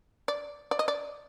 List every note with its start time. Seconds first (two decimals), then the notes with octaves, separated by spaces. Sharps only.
0.28 D5
0.71 D5
0.79 D#5
0.88 D5